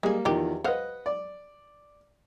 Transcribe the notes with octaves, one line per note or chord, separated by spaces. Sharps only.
G3 G#3 A#3 G#4
E2 D#3 F3 D#4 G4
B4 C5 D#5 F5 F#5
D5